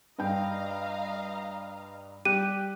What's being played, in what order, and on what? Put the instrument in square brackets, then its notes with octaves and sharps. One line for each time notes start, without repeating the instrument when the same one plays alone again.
[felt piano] G2 G5 [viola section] D#5 F5 A#5
[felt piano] G3 [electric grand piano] G4 F#6 [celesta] D#7